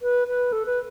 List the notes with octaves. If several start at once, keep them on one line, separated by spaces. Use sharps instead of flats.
B4
B4
A4
B4